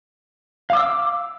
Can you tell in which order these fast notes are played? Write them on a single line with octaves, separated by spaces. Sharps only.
F5 D6 E6